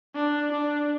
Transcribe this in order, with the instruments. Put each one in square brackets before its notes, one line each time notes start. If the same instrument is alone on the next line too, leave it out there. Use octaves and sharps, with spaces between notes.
[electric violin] D4
D4